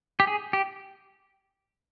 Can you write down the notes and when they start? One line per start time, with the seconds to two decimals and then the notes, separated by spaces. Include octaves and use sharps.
0.20 G4
0.27 G#4
0.53 G4